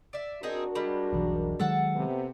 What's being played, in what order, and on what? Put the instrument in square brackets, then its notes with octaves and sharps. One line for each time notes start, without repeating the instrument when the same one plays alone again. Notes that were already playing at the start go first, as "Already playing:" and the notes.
[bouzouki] D5 E5
[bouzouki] C4 D#4 G#4 [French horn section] D4 F#4 A#4
[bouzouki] G3 G#3
[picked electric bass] E1 B1 E3
[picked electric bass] D#3 F#3 G#3 [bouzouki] A4 F#5 A5
[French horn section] C3 B3